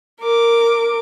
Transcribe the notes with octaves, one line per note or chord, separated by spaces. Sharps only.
A#4 D6